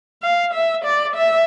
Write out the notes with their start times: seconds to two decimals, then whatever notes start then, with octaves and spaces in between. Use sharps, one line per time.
0.23 F5
0.53 E5
0.84 D5
1.16 E5